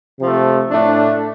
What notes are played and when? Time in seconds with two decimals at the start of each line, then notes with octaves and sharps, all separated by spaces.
0.20 C3 F3 A3
0.71 A2 A3 D4